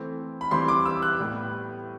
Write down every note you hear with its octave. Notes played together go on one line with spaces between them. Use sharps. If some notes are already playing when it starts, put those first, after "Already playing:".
Already playing: E3 A3 C4
B5
E3 G3 C4 C6
D6
E6
F#6
A2 G3 B3